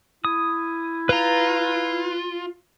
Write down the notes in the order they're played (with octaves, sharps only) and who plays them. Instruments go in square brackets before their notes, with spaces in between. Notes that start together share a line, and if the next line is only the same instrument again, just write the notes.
[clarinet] E4 [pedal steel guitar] D#6
[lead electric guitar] F4 [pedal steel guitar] B4 A#5